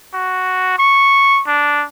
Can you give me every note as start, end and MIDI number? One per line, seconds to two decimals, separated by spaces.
0.14 0.77 66
0.78 1.42 85
1.47 1.85 62